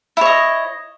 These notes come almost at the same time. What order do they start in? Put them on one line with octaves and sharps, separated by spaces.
E4 C#5 D#5